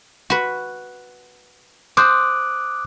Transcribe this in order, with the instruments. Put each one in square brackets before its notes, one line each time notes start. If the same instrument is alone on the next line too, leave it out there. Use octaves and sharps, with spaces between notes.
[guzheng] F#4 B4
[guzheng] C5 [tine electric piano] D6 D#6 F#6